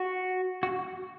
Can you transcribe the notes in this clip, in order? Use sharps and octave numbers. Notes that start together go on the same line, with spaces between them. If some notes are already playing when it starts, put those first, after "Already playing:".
Already playing: F#4
F#4